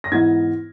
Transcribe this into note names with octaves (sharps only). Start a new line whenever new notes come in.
A#6
G#2 E3 B3 E4 G#6